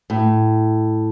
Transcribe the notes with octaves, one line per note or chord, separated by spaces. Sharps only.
A2